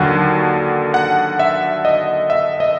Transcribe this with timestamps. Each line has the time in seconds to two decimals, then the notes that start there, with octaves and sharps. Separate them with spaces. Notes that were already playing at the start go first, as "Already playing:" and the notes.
Already playing: D#2 D3 F#3 F#5
0.94 F#5
1.39 E5
1.85 D#5
2.30 E5
2.60 D#5